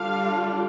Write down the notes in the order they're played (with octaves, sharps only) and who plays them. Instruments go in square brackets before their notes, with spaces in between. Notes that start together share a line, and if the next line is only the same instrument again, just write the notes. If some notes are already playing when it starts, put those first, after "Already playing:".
Already playing: [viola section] D3 G3 D4 F4 F5